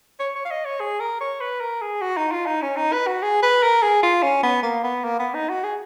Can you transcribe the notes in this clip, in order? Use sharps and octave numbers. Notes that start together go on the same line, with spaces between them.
C#5
C#5
F5
D#5
C#5
G#4
A#4
C#5
B4
A#4
G#4
F#4
D#4
F4
D#4
C#4
D#4
B4
F#4
G#4
B4
A#4
G#4
F4
C#4
B3
A#3
B3
A#3
B3
D#4
F#4
G#4